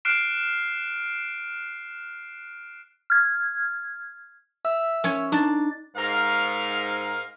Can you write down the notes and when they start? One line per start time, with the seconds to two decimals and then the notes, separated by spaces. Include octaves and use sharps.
0.05 F6 F#6 C7 D7 E7
3.10 F6 G#6
4.65 E5 E6
5.04 C#4 C#5
5.32 D4 D#4 A6
5.97 G#2 A#4 F5